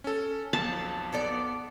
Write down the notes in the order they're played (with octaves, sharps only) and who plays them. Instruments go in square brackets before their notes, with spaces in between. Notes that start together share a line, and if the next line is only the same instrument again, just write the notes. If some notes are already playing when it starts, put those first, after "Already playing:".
[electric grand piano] C#4 A4
[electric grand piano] B1 F2 A6 [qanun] A5
[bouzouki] B3 A4 D5